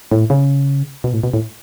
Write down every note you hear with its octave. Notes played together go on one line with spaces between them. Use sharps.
A2
C#3
B2
A2
B2
A2